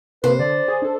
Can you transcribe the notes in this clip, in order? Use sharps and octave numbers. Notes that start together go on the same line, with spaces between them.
C3 A#3 B4 C5
D3 D5
G#4
D4 A4